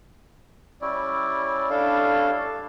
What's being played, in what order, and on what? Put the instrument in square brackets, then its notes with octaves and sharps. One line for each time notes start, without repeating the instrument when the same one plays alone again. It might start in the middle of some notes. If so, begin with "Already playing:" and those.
[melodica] G3 C#4 E4 [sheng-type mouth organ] D5
[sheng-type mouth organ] D4 A4 F5